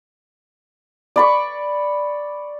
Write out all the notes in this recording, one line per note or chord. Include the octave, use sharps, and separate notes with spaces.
D5 B5 C#6